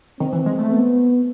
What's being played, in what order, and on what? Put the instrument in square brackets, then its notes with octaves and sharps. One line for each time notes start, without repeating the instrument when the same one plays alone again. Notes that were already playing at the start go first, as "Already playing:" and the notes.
[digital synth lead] D#3 [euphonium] C4
[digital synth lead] E3
G#3
A3
[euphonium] B3